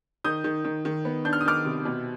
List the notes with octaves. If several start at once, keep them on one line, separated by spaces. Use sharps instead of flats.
D#3 D#6 G6
D#3
D#3
D#3
B3
D4 G6
F6
D#6
D#3 D6 F6
C3
B2